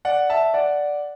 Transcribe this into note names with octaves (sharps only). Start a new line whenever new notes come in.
D5 F#5
E5 A5
D5 F#5